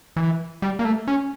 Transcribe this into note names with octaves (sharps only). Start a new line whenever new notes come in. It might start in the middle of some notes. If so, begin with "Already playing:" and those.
E3
G3
A#3
A3
C#4